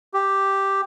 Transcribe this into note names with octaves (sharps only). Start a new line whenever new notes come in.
G4